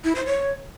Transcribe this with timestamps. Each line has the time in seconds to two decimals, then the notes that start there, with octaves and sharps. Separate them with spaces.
0.04 E4
0.15 C5
0.26 C#5